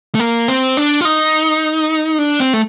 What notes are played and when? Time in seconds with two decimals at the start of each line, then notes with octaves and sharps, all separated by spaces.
0.15 A3
0.20 A#3
0.48 C4
0.77 D4
1.01 F4
1.05 D#4
2.19 D4
2.40 C4
2.53 A3